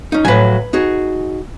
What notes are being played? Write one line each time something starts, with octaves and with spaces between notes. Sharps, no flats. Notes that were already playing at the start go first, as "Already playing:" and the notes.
C#4 D#4
A2 F3 F#3 B4 G#5
D#4 F#4 G#4